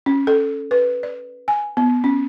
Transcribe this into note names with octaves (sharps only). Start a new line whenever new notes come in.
C#4
A4
B4
D5
G#5
B3
C#4